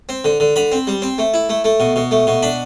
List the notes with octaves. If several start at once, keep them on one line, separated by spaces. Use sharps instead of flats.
C4
D3
D3
D3 B5
C4
G3
C4
A3
E4
A3
A3
B2
B2
A3
B2
D4 B5